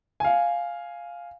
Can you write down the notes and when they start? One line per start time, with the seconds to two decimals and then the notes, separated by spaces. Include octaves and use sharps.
0.20 F5 G#5